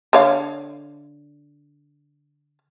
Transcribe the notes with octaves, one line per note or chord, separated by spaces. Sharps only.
D3 C#5 F5